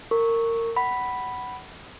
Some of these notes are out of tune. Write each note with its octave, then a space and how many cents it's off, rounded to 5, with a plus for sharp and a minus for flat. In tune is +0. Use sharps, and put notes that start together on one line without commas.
A#4 -25 C#6 +0
F#5 +25 B5 +0